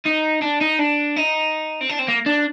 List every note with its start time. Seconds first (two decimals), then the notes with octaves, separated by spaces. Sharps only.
0.06 D#4
0.42 D4
0.61 D#4
0.79 D4
1.16 D#4
1.81 C4
1.89 D4
1.99 C4
2.08 A#3
2.26 D4